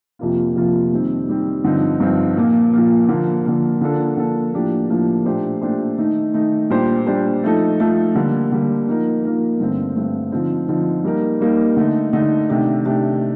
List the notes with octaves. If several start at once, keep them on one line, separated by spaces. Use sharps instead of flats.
F2 C3 F3 A#3 F4
F2 C3 F3 A#3 F4
D#3 G3 C4
D#3 G3 C4
G2 D3 F3 C4 D#4
G2 D3 F3 C4 D#4
A#2 F3 A#3
A#2 F3 A#3
D3 F3 A#3
D3 F3 A#3
D3 F3 A#3 D4 A4
D3 F3 A#3 D4 A4
A2 F3 A#3 D4 G4
A2 F3 A#3 D4 G4
A#2 A3 D4 G4 C5
A#2 A3 D4 G4 C5
D#3 A3 D#4
D#3 A3 D#4
A#2 G3 D4 G4 C5
A#2 G3 D4 G4 C5
F3 A3 D#4 A4
F3 A3 D#4 A4
D3 G3 A#3
D3 G3 A#3
F3 A#3 D#4 A#4
F3 A#3 D#4 A#4
G2 D3 A3 C4
G2 D3 A3 C4
D3 F3 C4 D#4
D3 F3 C4 D#4
G3 A#3 D#4 A#4
G3 A#3 D#4 A#4
D3 A3 D#4
D3 A3 D#4
C3 D#3 A3 D4 G4
C3 D#3 A3 D4 G4